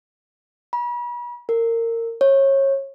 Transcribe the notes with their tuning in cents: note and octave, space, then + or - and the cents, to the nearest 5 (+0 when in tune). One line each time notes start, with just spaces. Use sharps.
B5 -40
A#4 -25
C#5 -25